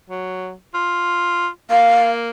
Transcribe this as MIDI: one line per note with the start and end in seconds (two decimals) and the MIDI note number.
0.10 0.53 54
0.74 1.48 65
1.71 2.31 58
1.71 2.08 77